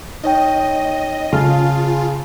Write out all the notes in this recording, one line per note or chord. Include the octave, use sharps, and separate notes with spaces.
D#4 C#5 D#5 G5
C#3 F4 A5 F6